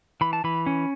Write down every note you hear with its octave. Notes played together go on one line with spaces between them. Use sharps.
E3 B5
A5
E3 B5
C#4